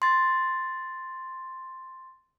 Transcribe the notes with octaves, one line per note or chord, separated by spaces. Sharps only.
C6 A6